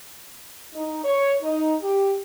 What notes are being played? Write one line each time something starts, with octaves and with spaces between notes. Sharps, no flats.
D#4
C#5
D#4
G4